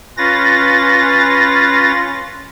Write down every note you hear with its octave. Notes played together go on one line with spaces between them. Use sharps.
C#4 F4 B4 A6 A#6